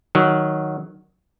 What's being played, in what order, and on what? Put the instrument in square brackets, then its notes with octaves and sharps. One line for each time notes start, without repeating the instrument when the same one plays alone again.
[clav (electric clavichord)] D#3 F#3